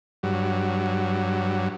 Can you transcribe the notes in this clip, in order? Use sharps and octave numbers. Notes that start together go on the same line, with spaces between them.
G2 F#3